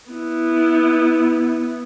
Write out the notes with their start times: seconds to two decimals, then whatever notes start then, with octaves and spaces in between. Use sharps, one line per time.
0.10 B3 E4